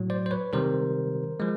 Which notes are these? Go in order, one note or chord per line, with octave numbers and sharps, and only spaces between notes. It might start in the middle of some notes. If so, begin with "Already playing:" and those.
Already playing: A2 F#3
C5 D5
C5
B4 C#5
C3 D#3 G3 A#4 C5
F3 G#3